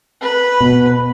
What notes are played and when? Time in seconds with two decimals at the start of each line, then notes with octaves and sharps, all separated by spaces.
0.21 B4
0.61 B2